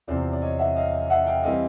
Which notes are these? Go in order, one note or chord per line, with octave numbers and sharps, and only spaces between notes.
E2 C3 F3 C5 D5
D5
C#5 D#5
E5 F#5
D#5 F5
E5 F#5
F5 G5
E3 G3 C4 D#5 F5